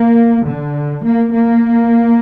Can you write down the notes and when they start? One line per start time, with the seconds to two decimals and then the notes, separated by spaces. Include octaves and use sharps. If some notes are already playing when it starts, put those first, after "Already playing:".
Already playing: A#3
0.46 D3
1.04 A#3
1.33 A#3